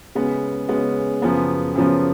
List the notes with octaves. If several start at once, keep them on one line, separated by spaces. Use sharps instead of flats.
C#3 G#3 B3
C#3 G#3 B3
F#2 C#3 F3 B3
F#2 C#3 F3 B3